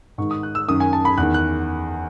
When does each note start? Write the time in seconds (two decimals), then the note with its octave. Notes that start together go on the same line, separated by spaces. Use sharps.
0.18 G#2 D#3 C#6
0.31 D#6
0.43 F#6
0.55 E6
0.68 F#2 D#3 D#6
0.80 G#5
0.93 A5
1.05 B5
1.18 E2 D#3 F#6
1.34 F#6